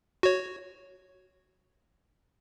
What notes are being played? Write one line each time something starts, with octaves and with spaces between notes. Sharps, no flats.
F#4 C#5